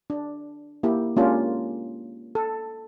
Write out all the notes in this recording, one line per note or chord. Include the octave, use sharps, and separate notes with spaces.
D4
A#3 E4 G4
G#3 A#3 C#4 D4 F4 G4
A4